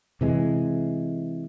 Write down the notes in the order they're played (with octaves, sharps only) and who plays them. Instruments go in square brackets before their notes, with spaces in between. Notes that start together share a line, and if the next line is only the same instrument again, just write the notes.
[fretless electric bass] C3 E3 G#3